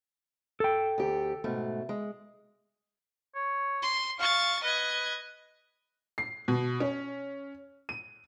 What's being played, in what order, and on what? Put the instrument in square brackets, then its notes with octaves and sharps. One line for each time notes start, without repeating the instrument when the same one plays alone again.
[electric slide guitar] A4 G5
[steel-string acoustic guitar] D2 G4
G#2 B2 A3
G#3
[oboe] C#5
[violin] C6
[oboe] F5 [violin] C#6 A6
[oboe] B4 [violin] D#5 G#6
[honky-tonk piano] C7
B2
C#4
D#7